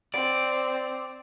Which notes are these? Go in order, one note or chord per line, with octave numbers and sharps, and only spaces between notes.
C4 D5